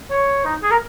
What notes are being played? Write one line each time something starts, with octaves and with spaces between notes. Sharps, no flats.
C#5
D#4
G#4
A#4